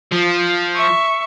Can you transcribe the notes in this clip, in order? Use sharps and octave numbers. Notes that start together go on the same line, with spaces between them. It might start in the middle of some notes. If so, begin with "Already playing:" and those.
F3
E5 C#6